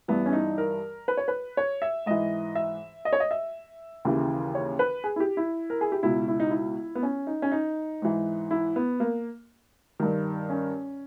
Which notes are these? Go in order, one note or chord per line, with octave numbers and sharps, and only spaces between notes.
G2 E3 B3
C#4
D#4
A#4
B4
C#5
B4
C#5
E5
G#2 E3 D#5
E5
D#5
C#5
D#5
E5
D#2 C#3 E3
C#5
B4
G#4
E4
G4
E4
A#4
G#4
G4
C#2 B2 E4
E4
D#4
E4
B3
C#4
D#4
C#4
D#4
G#2 E3
E4
B3
A#3
G2 D#3
C#4